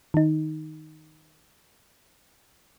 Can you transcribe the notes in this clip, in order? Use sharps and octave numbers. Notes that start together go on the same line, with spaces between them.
D#3 D#4